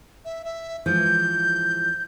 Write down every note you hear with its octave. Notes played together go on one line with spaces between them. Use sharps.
E5
E5
E3 F3 G#3 G6